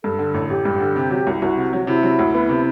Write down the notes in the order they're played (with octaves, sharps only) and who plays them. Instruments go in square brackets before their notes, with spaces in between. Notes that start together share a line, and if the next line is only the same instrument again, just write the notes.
[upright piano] G2 [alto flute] A4
[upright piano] D3
A1
[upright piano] A1 [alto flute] G4
[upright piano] G2
D3
C3
F#3
C2
[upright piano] C2 [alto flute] F#4
[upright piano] C3
F#3
[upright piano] C3 [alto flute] E4
[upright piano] F#3
D2
B3
C3